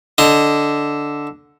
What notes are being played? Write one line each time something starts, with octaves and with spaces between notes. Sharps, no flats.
D3 D#5